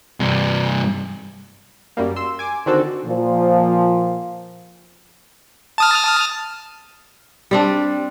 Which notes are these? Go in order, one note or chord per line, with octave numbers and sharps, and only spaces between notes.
G2 C3
F#2 G3 A#3
C6 E6
G#5 D6
D3 D#3 C4 D4 F#4 A4
A#2 F3
A5 D#6 F6
G3 C4 D4